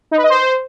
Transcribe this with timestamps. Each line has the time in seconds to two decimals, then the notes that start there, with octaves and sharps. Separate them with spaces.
0.11 D#4
0.17 B4
0.24 D#5
0.30 C5